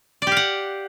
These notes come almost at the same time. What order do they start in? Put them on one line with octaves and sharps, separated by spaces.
D5 G4 F5 F#5